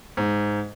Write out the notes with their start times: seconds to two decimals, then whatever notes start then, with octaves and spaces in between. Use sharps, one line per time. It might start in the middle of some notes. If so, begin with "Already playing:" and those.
0.17 G#2